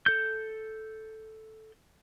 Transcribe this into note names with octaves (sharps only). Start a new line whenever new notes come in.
A4 G6